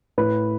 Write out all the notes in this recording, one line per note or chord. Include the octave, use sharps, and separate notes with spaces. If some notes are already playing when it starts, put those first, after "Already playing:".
A2 B4